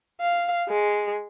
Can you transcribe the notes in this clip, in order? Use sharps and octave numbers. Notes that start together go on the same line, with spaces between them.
F5
G#3